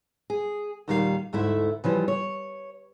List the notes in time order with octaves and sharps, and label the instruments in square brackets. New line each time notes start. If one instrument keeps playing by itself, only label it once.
[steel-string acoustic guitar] G#4
D#2 A#2 D#3 G3 F4 F5
D2 G#2 A3 E4 E5
C#3 E3 F3 G3
C#5